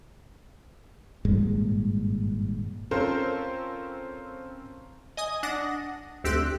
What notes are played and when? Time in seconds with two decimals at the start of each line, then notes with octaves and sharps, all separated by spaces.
1.25 G#1 G2 A#2 G#3
2.91 C4 C#4 F4 A4 A#4 C5
5.17 D#5 G#5 D#6
5.43 D4 F#5 D#6 A#6
6.24 D2 C4 G4 E6 F#6 D7